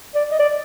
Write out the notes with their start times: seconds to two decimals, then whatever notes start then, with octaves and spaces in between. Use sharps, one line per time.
0.15 D5
0.31 D#5
0.40 D5